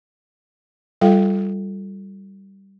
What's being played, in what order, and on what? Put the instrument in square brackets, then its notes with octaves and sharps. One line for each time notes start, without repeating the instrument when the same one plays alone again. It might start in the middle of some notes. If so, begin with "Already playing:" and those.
[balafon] G3 F4 A4 F5 G5